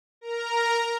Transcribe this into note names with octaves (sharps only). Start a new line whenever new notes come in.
A#4 A#5